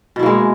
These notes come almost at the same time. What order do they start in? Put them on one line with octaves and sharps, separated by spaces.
B2 E4 A#3 G#3